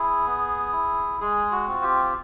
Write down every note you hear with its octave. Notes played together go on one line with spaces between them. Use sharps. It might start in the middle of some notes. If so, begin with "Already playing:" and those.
Already playing: E4 G#4
B3
E4
G#3 G#4
F#4
C4 F4
G4